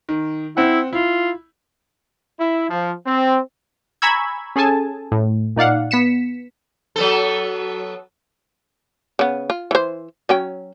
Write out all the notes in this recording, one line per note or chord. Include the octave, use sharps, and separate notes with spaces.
D#3
C4 E4 F#5
E4 F4
E4
F3
C4
G#5 A#5 B5 C#6 E6 G#6
C#4 G#4 A4 G#5 A5
A2
A#2 D#4 D5 F5 F#5
B3 B6 C#7 E7
F#3 B3 A4
C#3 B3
F4
E3 C5
F#3 C#4 G5